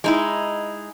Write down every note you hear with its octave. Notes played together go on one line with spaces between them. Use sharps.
G#3 D#4 E4